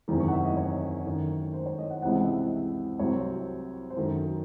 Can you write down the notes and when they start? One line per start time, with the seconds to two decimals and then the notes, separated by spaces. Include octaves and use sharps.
0.08 F#1 E2 C3 D#3
0.20 C#6
0.28 F#5
0.33 E5
0.45 D#5
0.57 C#5
1.05 F#2 D#3 A3
1.54 C5
1.66 C#5
1.78 D#5
1.90 F#5
2.02 C#2 C3 E3 C4 F#5
2.11 E5
2.19 D#5
2.27 E5
2.99 C2 C3 F#3 C4 C#5
3.91 C5
3.96 F#2 D#3 F#3 A4